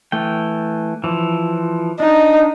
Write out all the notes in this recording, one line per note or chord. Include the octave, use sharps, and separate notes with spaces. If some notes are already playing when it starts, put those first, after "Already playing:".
E3 A3 G5
E3 F3
D4 D#4